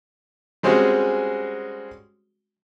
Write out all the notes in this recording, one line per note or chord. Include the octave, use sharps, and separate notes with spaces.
G3 G#3 C4 C#4 F#4 G#4